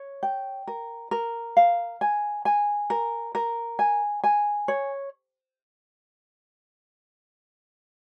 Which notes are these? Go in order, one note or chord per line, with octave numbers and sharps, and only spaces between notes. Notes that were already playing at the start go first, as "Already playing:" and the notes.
Already playing: C#5
G5
A#4
A#4
F5
G#5
G#5
A#4
A#4
G#5
G#5
C#5